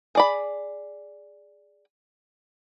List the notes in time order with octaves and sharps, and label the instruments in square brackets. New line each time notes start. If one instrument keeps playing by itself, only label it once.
[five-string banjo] G#4 D5 B5